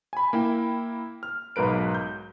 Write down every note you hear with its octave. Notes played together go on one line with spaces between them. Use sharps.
G#5 B5
A#3 E4 G5
F6
B1 G#2 A#4 B4 D7
G6